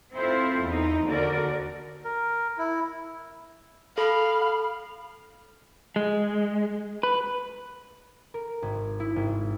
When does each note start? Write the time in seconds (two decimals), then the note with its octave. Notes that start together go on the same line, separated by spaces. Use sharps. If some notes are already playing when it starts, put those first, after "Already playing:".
0.14 C4 E4 F4 A4 C5
0.64 E2 D#4
1.05 D#2 D3 F#4 A#4 D5
2.04 A#4
2.58 E4
3.98 A4 F5 B5
5.96 G#3
7.03 B4
8.34 A#4
8.62 G#1
9.00 E4
9.16 G#1